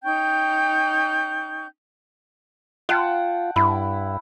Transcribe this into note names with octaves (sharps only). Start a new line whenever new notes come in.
C#4 D#4 G5 G6
F4 F#5 G5 A5
G2 E4